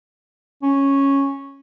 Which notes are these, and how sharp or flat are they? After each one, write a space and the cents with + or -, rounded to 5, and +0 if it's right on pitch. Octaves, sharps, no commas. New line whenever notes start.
C#4 -5